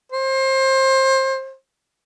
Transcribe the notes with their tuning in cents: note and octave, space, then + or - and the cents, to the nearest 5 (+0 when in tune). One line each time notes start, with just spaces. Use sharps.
C5 +25